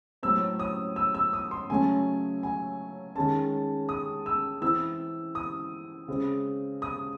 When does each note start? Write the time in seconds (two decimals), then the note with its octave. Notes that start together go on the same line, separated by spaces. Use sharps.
0.23 A2 F#3 C4 E6
0.59 D#6
0.96 E6
1.15 E6
1.33 D#6
1.51 C6
1.70 C#3 F#3 A3 C#4 G#5
2.43 G#5
3.15 D#3 G#3 C#4 A5
3.89 D#6
4.26 E6
4.61 E3 C4 E6
5.35 D#6
6.08 C#3 G#3 C4
6.82 D#6